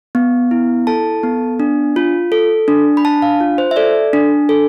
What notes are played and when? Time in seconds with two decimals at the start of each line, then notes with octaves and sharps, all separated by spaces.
0.15 B3
0.51 E4
0.87 A4 A5
1.23 B3
1.60 D4
1.96 F4
2.32 A4
2.68 D4
2.97 B5
3.05 D4 A5
3.22 F5
3.40 F4
3.58 C5
3.71 E5
3.76 A4 D5
4.13 D4
4.49 A4